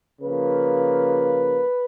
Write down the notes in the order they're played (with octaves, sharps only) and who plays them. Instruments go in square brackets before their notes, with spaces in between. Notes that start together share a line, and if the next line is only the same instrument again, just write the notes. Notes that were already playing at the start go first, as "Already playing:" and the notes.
[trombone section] C#3 F3 A#3 B4